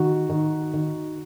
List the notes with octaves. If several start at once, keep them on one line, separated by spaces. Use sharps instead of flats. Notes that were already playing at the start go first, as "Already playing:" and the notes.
Already playing: D#3 F#4
D#3
D#3